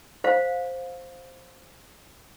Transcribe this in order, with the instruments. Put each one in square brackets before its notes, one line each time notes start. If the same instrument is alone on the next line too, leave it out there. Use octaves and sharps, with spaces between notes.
[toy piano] C5 F5